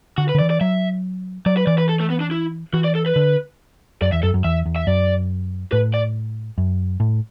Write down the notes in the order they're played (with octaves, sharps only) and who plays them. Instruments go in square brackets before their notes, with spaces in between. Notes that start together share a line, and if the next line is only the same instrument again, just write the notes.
[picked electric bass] D3 [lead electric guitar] F#4
[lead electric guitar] B4
[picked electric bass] D3
[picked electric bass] E3 [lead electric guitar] D5
[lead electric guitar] D5
[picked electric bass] F#3 [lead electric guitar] E5
[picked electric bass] F#3 [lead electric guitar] D5
[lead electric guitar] B4
[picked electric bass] E3 [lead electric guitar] D5
[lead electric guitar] B4
A4
A3
B3
D4
E4
[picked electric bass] E3 [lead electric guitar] F#4
[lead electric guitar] D5
A4
B4
[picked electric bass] D3
[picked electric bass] F#2 [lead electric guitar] D5
[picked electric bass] E2 [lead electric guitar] E5
[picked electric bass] F#2 [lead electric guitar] A4
[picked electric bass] F#2
[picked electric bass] E2 [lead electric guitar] E5
[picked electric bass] E2
[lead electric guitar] E5
[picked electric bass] F#2 [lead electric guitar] D5
[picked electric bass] A2 [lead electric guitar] B4
[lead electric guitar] D5
[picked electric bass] F#2
A2